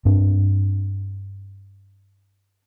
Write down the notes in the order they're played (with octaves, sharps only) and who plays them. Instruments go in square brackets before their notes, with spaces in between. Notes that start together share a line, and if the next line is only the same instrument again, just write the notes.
[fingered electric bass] G2 C4 D4